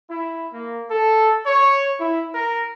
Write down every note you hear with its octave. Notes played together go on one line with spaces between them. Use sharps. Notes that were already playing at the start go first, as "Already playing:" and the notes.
E4
A#3
A4
C#5
E4
A#4